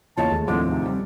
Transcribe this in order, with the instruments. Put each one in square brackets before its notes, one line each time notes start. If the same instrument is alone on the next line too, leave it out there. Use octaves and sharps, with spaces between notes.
[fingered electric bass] E2 C#3 E3 [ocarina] A#3 [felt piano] F4 C#5 D#5 [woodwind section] A5
[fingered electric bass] D#2 [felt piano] G#3 A3
[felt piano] A2 F3 D6 [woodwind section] D3 G#3 [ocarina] C4
[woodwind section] G#2 C3
[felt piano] G3